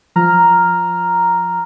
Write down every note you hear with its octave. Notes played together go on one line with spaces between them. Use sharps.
F3 A#5 F6